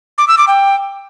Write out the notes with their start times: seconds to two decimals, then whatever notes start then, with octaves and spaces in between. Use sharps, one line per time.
0.18 D6
0.28 E6
0.38 D6
0.48 G5